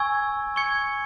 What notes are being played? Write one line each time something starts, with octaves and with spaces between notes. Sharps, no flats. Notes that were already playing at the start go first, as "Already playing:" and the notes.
Already playing: G#5 C#6 E6 G#6
C#6 G#6 C#7